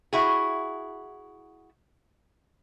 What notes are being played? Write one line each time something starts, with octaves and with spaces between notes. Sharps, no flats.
E4 F#4 G#4